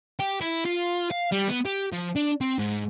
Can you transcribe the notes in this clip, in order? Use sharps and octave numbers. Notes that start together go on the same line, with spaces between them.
G4
E4
F4
F5
G3
B3
G4
F3
D4
C4
G#2